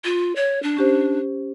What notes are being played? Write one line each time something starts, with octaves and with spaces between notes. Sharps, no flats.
F4
C#5
D4
C#4 G4 C5